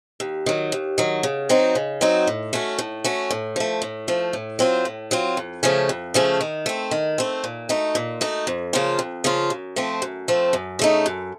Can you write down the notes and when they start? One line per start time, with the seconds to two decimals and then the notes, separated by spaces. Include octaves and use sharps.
0.20 D#2
0.46 D#3 F#3
0.72 D#2
0.98 D#3 F#3
1.23 C#3
1.49 F#3 C4 D#4 F#4
1.75 C#3
2.01 F#3 C4 D#4 F#4
2.27 A2
2.53 A3 C#4 F#4
2.79 A2
3.04 A3 C#4 F#4
3.31 A2
3.56 F3 A3
3.82 A2
4.08 F3 A3
4.33 A2
4.59 F#3 C4 F4
4.85 A2
5.11 F#3 C4 F4
5.37 F2
5.63 C#3 F3 A3 C#4
5.89 F2
6.14 C#3 F3 A3 C#4
6.41 D#3
6.66 A3 C4
6.91 D#3
7.18 A3 C4
7.44 A#2
7.69 A3 D#4 F#4
7.95 A#2
8.21 A3 D#4 F#4
8.47 F2
8.73 C#3 F3 A#3 F4
8.99 F2
9.24 C#3 F3 A#3 F4
9.50 F#2
9.76 F3 A3 C4
10.02 F#2
10.28 F3 A3 C4
10.53 F#2
10.79 C#3 A3 D#4
11.06 F#2